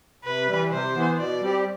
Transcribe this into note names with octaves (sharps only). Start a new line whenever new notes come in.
C3 B4
E3 G3
C3 C5
E3 B3
B2 D5
G3 C4 G4